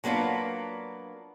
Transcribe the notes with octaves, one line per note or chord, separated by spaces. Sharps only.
F#3 A#3 B3 D4 F4